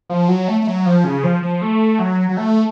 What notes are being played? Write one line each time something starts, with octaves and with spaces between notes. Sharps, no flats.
F3
F#3
A3
A3
F#3
F3
C#3
F3
F3
A3
F#3
F#3
A3